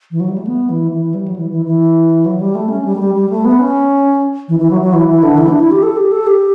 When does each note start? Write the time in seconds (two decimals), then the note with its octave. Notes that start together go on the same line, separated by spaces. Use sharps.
0.11 E3
0.20 F#3
0.29 G3
0.38 A3
0.47 B3
0.70 E3
0.91 E3
1.14 G3
1.28 F#3
1.36 E3
1.51 E3
1.66 E3
2.26 F#3
2.40 G3
2.55 A3
2.69 C#4
2.85 G3
2.95 A3
2.99 G3
3.15 G3
3.30 A3
3.45 B3
3.60 C#4
4.48 E3
4.59 E3
4.70 F#3
4.81 F#3
4.93 E3
5.08 E3
5.23 D3
5.38 E3
5.48 D4
5.59 E4
5.71 G4
5.83 A4
5.97 G4
6.12 A4
6.27 G4